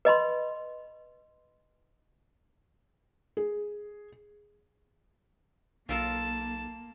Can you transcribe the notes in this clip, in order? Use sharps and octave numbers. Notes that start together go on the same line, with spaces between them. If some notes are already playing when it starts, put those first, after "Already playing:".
B4 D#5 B5 C6
G#4
B1 A#3 F4 A4 A#4 A5